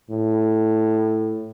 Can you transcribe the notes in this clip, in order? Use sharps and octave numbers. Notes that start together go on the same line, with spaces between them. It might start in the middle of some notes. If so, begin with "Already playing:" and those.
A2